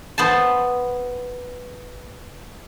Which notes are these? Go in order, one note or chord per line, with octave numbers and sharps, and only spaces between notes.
B3 C5 A5